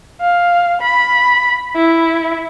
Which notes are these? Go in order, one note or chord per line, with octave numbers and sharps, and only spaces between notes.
F5
B5
E4